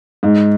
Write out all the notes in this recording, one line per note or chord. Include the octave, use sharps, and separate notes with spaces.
G#2